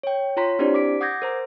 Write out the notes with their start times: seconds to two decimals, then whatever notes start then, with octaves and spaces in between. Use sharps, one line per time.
0.03 C#5 G5
0.37 F4 C#5 A#5 C6 B6
0.59 C4 D4 E4 G4 C5 D5
0.74 D6 B6 D7
1.01 F#5 D6 D#6 G6 G#6 A#6
1.22 A#4 C5 A#5